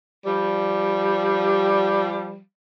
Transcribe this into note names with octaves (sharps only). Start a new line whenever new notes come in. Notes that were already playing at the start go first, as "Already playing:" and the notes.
F3 G3